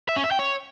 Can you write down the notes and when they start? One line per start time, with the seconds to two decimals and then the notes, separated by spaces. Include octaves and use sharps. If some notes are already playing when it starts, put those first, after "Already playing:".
0.09 E5
0.16 C#4
0.24 E5
0.31 G5
0.39 C#5